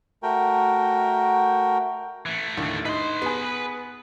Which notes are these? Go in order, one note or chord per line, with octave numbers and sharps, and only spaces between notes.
A3 F#4 A#4 G5
E3 A3
D#2 A2 D3
D#4 B4 C6
B3 G#4